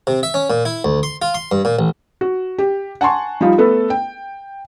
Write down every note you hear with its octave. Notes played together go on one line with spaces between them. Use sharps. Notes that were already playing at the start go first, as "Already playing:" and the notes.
C3
E5
C#4
A#2
E4
D2
C6
F4
C6
G2
A#2
A1
F#4
G4
F#5 G#5 A5 C6 C#6
F3 G3 D#4 F4
A3 B3 A4 B4
G5